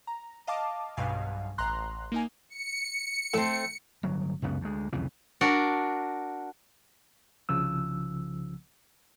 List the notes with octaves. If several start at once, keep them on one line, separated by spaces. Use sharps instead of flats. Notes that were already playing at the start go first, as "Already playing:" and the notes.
A#5
D#5 F5 A5 D6
B1 G2 B2 F5 G#5
A1 A#5 C6 F#6
A#3 D#4 G#5
C#7
A2 A3 C4
G1 F#3
C#2 F#2 C#3 B3
D2 G#3
C2 F2 C#3 E3
D4 F#4 A#4
C2 C#3 F3 E6